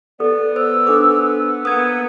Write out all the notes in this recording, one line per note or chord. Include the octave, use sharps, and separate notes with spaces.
B3 A4 D5
C5 E6
D4 A4 C5 D6
A#3 B3 D#6 G#6